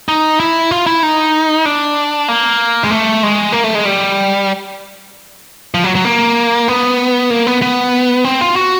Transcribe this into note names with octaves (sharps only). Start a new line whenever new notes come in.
D#4
E4
F4
E4
D#4
D4
A#3
G#3
A3
G#3
A#3
A3
G#3
G3
F3
F#3
F#3
A#3
B3
A#3
B3
B3
C4
F4
F#4